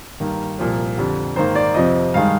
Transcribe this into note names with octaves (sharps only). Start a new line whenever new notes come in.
G2 D#3 A#3
C2 A#2 F3
F2 D3 G3
G#2 D#3 A#3 C5
D5
F2 C3 F3 C4 D#5
G2 D#3 G#3 F5